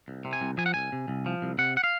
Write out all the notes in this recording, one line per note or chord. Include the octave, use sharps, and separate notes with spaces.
C2
C3
G#5
C2
F3 G#5
F#5
C2 G#5
C3
C2
F3
C2
C3 F#5
F#5
F5